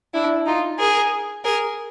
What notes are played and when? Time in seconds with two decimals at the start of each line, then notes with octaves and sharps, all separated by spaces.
0.14 D4 E4
0.46 D#4 F4
0.79 G#4 A#4
1.44 G#4 A#4